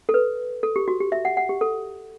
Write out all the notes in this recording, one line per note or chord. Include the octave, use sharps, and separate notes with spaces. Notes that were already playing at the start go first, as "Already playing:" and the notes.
A4
B4
A4
G4
F#4
G4
E5
F#5
F#5
G4
A4